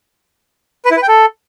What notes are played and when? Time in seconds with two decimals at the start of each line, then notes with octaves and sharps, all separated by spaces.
0.85 B4
0.91 E4
0.97 B4
1.02 G5
1.08 A4